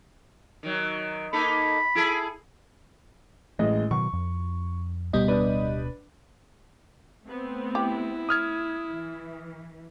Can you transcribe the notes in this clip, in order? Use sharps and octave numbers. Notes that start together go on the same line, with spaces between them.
D#3 F#3
A#3 D#4 A4 B5
E4 G#4 A4
A1 G#3 A3 D#5
B2 D#3 F#3 C#6
F2
D1 B2 G3 B3 D#5
D4 B4
A3 B3 C4
E4 G4
D#6 F6 G#6
E3